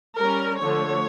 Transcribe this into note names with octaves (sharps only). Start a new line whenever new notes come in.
G3 C#4 A#4
D3 F3 A3 C#5